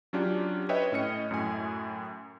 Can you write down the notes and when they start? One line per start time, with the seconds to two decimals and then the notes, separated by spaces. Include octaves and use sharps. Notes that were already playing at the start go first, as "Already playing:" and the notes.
0.13 F#3 C#4 D4 F4 G4
0.69 B4 C#5 D#5 E5 G5
0.92 A2 C#4 D#5 C#7
1.31 F#2 A2 G#5